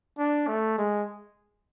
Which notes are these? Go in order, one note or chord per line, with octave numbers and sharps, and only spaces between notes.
D4
A3
G#3